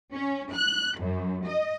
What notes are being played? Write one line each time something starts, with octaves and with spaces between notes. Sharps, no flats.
C#4
F#6
F#2
D#5